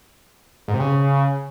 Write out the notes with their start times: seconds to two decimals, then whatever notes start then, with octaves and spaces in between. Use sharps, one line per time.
0.68 G#2
0.74 C3
0.80 C#3